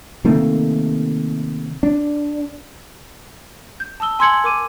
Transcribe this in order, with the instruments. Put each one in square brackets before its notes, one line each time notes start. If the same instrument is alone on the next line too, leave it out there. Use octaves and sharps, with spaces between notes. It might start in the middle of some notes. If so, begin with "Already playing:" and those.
[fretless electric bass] C3 D#3 A3 A#3
D4
[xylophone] G6
A5 D#6 E6 G7
G#5 C6 E6 G#6 C#7 F#7
A#4 D6 D#7